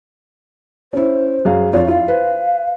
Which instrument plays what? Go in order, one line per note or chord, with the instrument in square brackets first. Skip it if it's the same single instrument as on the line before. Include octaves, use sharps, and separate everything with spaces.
[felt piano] C#4 E4 [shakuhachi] C5
[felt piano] F#2 G#4 F5
[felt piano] F2 F4 C#5 [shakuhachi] D5
[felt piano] E4 F4 [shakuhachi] F5
[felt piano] B4 C5